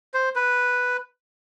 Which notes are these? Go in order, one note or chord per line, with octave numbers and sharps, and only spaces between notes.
C5
B4